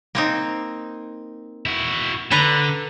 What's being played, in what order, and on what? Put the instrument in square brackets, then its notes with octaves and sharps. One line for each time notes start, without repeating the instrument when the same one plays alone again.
[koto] A#3 C4 D#4
[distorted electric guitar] E4 F#4
[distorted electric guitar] D3 [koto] A4 B4 A#5